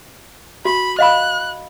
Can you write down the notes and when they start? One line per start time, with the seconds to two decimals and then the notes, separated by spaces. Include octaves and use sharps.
0.65 F#4 B5
0.99 D#5 F5 B5 F#6